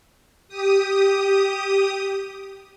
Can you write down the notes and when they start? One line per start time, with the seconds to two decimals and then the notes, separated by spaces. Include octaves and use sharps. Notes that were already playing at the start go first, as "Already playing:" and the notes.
0.48 G4 D#6